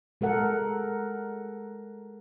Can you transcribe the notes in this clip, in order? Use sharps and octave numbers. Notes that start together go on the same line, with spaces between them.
G#3 A4 A#4 F#5